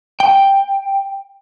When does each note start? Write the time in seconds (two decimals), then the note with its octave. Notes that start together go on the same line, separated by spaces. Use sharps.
0.20 G5